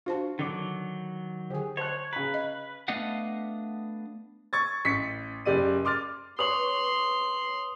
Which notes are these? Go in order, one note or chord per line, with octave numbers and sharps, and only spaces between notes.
D4 F4 F#4 C5 A5
D3 D#3 F#3 D6
D3 G4 G#4 G#5
C5 C#5 A5 F#6
C#3 B4 A#5
D#5
A3 B3 D4 D#5 F5 F#5
C#6 G#6 A6
A1 B6 C#7
F#1 G4 D5 D#7
C6 D6 F6 A6
B4 C#5 C6 C#6 D#6 F#7